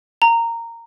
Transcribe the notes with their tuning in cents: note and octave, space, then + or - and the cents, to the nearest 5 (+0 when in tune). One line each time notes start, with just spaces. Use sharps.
A#5 -15